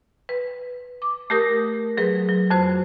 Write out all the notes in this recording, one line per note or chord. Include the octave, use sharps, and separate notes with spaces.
B4
D6
A3 G4 A#4 D#6
F#3 G#4 B4
F#3
F2 F#4 C5